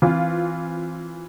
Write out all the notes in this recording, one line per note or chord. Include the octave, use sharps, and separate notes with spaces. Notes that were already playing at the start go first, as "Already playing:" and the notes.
E3 C4 F4